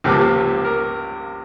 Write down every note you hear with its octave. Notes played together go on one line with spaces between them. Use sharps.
C#2 C3 F3 A#3 G4
A#4